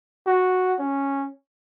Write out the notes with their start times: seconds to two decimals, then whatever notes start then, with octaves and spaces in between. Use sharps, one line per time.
0.27 F#4
0.79 C#4